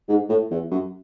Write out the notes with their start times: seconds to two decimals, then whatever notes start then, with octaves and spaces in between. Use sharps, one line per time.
0.09 G#2
0.29 A2
0.51 E2
0.71 F#2